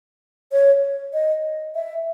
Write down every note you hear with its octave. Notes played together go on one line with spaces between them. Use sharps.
C#5
D#5
E5